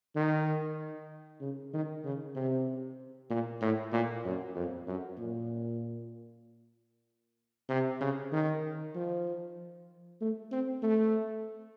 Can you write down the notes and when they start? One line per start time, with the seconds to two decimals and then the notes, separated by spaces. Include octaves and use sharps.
0.16 D#3
1.41 C#3
1.73 D#3
2.04 C#3
2.35 C3
3.30 A#2
3.62 A2
3.92 A#2
4.25 F#2
4.55 F2
4.87 F#2
5.18 A#2
7.69 C3
8.01 C#3
8.32 D#3
8.95 F3
10.21 A3
10.52 C4
10.83 A3